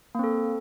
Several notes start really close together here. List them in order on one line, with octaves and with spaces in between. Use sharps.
A#3 C4 A4